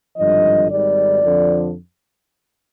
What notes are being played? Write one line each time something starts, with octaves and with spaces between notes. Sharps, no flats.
G#1 G2 D3 F3 D#5
G#1 G#2 D#3 G3 D5
F2 D3 F3